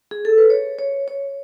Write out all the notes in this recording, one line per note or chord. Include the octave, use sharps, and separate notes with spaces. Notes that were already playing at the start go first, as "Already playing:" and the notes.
G#4
A4
B4
C#5
C#5
C#5